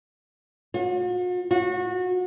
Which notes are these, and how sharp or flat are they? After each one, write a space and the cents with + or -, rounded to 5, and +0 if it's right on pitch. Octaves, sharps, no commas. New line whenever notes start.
F#4 -45
F#4 -25